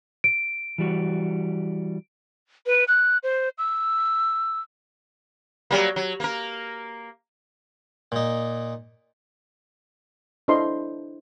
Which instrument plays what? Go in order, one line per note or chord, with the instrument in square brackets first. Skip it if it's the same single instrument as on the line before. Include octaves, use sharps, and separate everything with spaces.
[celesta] D7
[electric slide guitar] E3 G3 F#4
[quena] B4
F#6
C5
E6
[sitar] F#3 G3 A#3
F#3
A#3 A#4
[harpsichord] A#2 D#4
[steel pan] D4 E4 A4 C5 D#5 C6